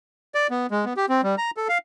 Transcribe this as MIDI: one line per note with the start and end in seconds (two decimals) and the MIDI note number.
0.35 0.47 74
0.50 0.67 59
0.71 0.85 56
0.85 0.93 59
0.97 1.06 67
1.09 1.21 60
1.23 1.35 55
1.38 1.51 82
1.57 1.68 69
1.69 1.78 77